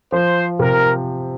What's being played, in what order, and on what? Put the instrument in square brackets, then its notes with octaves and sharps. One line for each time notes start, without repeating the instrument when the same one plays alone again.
[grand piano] F3 [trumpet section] C5
[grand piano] C3 [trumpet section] A#4